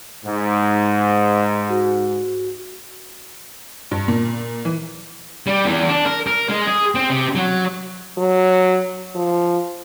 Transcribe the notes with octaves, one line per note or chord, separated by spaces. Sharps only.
G#2
F#4
G2
A#2
E3
G3
E2
D4
A#4
A#4
G#3
G#4
C4
C3
F#3
F#3
F3